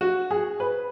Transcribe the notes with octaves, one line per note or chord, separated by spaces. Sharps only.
F#4
G#4
B4